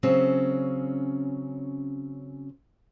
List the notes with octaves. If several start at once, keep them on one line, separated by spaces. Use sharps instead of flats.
C#3 F#3 C4 C#4